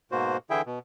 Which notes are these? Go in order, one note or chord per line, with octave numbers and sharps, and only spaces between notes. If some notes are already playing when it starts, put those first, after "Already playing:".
G#2 B2 A#3 F#4 C5
D3 E3 E4 G#4 E5 G5
B2